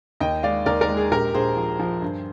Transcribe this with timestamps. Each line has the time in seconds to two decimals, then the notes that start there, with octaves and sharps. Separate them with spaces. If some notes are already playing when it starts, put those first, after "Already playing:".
0.20 D#2 D#5 G5
0.43 G#3 D5 F5
0.66 D#2 A#4 D5
0.81 A#4 D5
0.89 G#3
0.97 G#4
1.11 A#1 G4 A#4
1.34 A#1 G#4 C5
1.57 F3
1.79 F3
2.02 G2